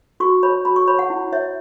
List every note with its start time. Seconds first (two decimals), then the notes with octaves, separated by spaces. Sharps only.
0.20 F#4 C#6
0.43 C#5 B5
0.65 F#4 B5
0.76 C#6
0.87 C#5 B5
0.99 F#5
1.10 E4
1.33 C#5 E5